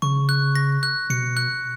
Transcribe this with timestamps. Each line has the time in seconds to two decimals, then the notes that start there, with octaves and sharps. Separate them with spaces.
0.02 C#3 C#6
0.29 F#6
0.55 A#6
0.83 F#6
1.10 B2 C#7
1.37 F#6